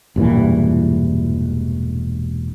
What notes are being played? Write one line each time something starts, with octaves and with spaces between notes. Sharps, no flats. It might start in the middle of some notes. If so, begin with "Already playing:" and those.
E1 G2 A#2 E3